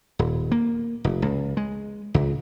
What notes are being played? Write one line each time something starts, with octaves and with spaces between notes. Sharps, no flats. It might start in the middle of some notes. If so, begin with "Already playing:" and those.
D#1
A#3
F1
C#2
G#3
C#2